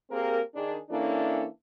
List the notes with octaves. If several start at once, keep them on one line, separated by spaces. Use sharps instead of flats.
A#3 C4 G4 G#4 A#4
D#3 D4 G#4
E3 A#3 C#4 D4 E4 A4